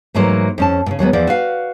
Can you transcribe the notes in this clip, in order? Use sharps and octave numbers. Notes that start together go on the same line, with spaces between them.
G#2 E3 F#3 A3 A#3 C5
F2 C#4 A5
A#2 C#3
D#2 F#3 G#3 B3
E2 F3 E4 D5
F#4 B4 F5